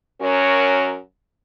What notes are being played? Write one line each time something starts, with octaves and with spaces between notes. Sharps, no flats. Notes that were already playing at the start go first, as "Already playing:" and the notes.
F#2 C#4 F#4 A#4 C#5